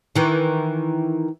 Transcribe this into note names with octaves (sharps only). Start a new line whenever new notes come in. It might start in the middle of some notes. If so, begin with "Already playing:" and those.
D#3 E3